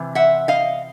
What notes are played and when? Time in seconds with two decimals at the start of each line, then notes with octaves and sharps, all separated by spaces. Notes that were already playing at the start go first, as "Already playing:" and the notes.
Already playing: C3 E3
0.15 E5 F#5
0.48 D#5 F5